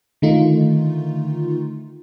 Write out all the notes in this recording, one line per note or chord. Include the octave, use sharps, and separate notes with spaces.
D3 D#3 A3 D#4 F4